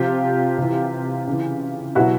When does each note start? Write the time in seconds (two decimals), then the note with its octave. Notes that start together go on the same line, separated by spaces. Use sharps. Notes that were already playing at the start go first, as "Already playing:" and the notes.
Already playing: C3 F3 F4 G4
0.58 C3 E3
1.27 C#3 E3
1.95 B2 F#3 E4 F#4